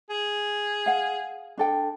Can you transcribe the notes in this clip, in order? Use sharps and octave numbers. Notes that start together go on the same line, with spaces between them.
G#4
F5 F#5
D4 A4 G5